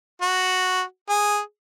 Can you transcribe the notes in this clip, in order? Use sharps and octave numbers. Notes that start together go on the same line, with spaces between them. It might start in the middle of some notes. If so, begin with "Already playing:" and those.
F#4
G#4